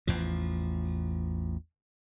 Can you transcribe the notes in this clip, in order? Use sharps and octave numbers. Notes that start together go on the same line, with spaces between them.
A1 E2 F3